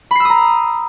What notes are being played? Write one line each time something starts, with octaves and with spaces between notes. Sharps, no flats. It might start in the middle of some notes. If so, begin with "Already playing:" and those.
A#5 B5 D#6 E6 C7